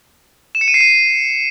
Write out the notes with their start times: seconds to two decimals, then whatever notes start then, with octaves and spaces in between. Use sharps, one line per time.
0.55 E7
0.61 C#7
0.68 D#7
0.74 C7
0.81 D#7